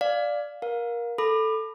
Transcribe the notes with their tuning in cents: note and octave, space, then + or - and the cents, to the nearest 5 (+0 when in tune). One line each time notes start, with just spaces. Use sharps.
D5 +0 F5 +5
A#4 +20 F5 +25
A4 +0 B5 +5 D6 +30